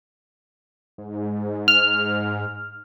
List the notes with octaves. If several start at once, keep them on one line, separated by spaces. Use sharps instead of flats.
G#2
F6